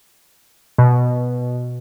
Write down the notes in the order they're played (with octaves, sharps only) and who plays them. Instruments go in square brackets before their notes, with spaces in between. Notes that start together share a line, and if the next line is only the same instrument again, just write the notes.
[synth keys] B2